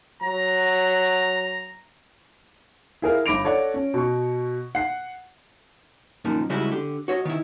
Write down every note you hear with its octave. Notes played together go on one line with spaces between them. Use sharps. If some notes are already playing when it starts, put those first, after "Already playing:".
F#3 A#5
E4 G#4 A#4 F5
G1 B5 D6 A#6 D7 F7
A4 C#5 D5 F#5
C#4
B2 C#6
F#5 C7
F#2 A#2 D#3 F3
C#3 G3 G#3 C#4 E4 F#4
D3 G4
F#4 C#5 D#5
D#3 E4